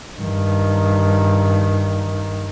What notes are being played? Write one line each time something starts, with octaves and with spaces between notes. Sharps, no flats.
G2 D#3